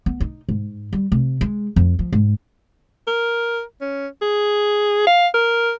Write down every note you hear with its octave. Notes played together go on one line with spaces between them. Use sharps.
B3
D#4
G#2
G3
C3
G#3
F2
F3
G#2
A#4
C#4
G#4
F5
A#4